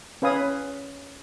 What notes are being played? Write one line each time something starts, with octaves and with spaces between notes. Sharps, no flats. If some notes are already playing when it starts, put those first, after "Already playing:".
C#4 B4 F5 G#5 D#6